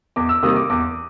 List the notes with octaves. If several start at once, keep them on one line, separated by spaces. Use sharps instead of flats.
E2 D6
E6
C3 D#3 G3 A#3 D#6
D6
E2 D6